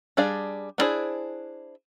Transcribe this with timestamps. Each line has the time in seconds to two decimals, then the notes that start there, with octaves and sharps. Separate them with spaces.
0.17 G3 D4 G#4 D5 F5
0.78 B3 D4 E4 G#4 C5